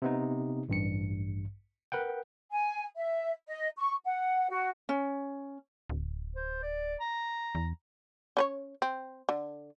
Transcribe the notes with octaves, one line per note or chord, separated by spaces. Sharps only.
C3 B3 D#4
A1 G2 C#7
A#4 B4 F#5 G5
G#5
E5
D#5
C#6
F#5
F#4
C#4
D1
C5
D5
A#5
E2
C#4 B4 C#5
C4
D3